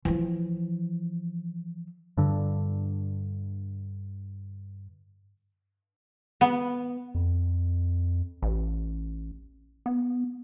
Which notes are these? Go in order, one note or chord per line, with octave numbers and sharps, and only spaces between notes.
E3 F3
G2 D3
B3
F2
A1
B3